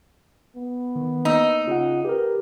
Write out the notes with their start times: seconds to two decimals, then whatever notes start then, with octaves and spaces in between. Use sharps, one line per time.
0.56 B3
0.96 D#3
1.25 A#3 D#4 E6
1.67 C#3 F4 F#5
2.05 G4 A#4 B4